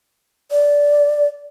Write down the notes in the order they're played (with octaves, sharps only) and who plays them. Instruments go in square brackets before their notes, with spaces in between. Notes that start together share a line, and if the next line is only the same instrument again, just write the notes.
[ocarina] D5